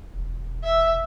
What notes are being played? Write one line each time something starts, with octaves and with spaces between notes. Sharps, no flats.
E1
E5